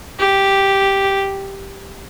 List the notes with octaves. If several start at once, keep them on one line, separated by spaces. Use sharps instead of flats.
G4